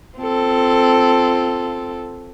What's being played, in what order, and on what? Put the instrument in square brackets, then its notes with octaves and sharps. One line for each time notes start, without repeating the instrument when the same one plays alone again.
[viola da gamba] C4 F4 A4